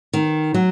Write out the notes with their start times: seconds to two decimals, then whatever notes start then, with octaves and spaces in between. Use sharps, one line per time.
0.13 D#3
0.54 F#3